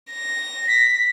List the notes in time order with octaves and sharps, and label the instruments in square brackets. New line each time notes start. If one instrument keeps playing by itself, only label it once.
[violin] A#6
[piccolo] B6